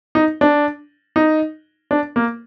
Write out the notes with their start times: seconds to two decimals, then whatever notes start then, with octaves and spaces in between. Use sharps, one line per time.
0.15 D#4
0.41 D4
1.16 D#4
1.91 D4
2.16 A#3